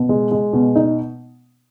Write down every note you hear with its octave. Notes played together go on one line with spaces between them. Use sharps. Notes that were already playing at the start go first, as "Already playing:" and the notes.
Already playing: B2
G#3
G#3
B2
D#4